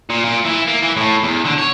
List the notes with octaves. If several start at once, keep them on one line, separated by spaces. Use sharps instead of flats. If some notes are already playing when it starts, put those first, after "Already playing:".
A#2
A#2
E3
A#3
E3
A2
E2
D3
C#5